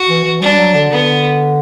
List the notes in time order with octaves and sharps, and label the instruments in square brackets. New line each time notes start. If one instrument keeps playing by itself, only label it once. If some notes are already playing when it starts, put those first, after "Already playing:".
Already playing: [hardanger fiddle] F#4
[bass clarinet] E3
E3
[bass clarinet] G3 [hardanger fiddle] D4
[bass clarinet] F#3
D3
[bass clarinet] D3 [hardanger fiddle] B3